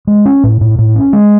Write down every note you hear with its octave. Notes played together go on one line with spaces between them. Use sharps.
G#3
C#4
A2
A2
A2
C#4
G#3